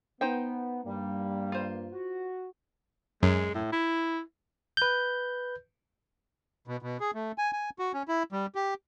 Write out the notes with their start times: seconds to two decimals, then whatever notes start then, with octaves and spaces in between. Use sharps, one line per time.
0.21 B3 D#4 C5 G5
0.85 G2 G3 A#3
1.52 F4 C5
1.92 F#4
3.23 F#2 G#3
3.55 A2
3.72 E4
4.77 B4 G6
6.67 B2
6.82 B2
7.00 G#4
7.14 A3
7.38 G#5
7.53 G#5
7.79 F#4
7.94 C#4
8.08 E4
8.32 G3
8.55 G4